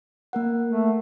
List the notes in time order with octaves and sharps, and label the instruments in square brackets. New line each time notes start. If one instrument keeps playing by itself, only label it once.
[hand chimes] A#3 A#4 F#5
[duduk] A3